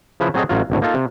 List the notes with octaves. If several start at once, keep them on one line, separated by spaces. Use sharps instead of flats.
C#3 F3 E4 B4 E5
F#3 C4 F#4 G#4 A4 D#5
A1 F#3 F4
G#1 D2 A2
A#3 D#4 F4 A4
C3